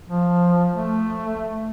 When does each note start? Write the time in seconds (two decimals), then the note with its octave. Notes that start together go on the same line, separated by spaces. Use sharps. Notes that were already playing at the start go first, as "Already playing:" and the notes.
0.08 F3
0.72 A3